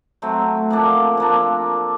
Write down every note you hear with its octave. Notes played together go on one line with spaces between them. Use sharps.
F#3 A3 C4
F3 A#3 D4
F3 A#3 D4